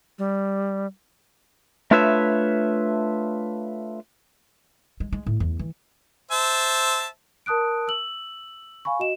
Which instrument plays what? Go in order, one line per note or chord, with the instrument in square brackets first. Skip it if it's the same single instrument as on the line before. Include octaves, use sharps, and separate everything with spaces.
[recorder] G3
[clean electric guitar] A3 D4 F4 B4 C#5 E5
[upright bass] G#3
G#3
A2
E2
E3
[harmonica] C5 E5 A5
[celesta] A#4 A5 D#6 F#6 D7
E6 F#7
F5 G#5 B5 C#6
F#4 D#5 E7